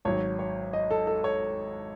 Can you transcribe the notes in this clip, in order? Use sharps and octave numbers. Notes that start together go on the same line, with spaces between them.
G#1 G#2 F#3 C#5
C#5
D#5
A4
A4
C#5